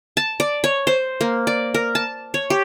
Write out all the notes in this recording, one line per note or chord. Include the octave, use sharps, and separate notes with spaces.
A5
D5
C#5
C5
A#3
D5
A#4
A5
C#5
G4